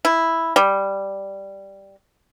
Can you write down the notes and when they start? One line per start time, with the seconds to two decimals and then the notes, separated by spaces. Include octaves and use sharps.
0.05 E4
0.56 G3